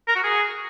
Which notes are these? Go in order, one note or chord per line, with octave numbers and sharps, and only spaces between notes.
A#4
F#4
G#4